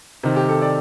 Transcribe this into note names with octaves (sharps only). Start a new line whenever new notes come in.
C3 D#3
G4
A4
D5